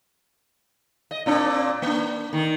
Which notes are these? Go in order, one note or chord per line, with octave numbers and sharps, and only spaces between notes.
D#5
A#2 C4 D4
A#3 D4
D#3